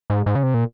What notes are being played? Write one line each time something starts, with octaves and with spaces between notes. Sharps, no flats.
G#2
G#2
C#3
C3
A#2